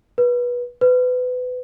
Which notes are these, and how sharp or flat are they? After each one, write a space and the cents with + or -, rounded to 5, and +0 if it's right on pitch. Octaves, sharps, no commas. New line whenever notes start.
B4 -20
B4 +25